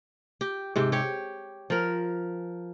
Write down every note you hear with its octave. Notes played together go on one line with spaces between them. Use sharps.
G4
G#2 C3 G4
G4 C#5
F3 A#4